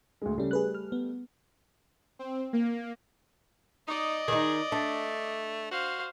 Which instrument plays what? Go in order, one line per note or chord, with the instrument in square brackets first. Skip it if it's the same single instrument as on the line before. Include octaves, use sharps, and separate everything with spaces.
[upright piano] D2 G#3
[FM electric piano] C#3 C#4 [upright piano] G3 A3
[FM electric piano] G#4 B4 F#6
F6
B3
[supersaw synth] C4
A#3
[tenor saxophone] D#4 [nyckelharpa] D5 D#5
[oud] D#3 D#4 [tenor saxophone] G#4
[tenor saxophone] A3 [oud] D4
[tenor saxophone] F#4 [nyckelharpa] C5 F5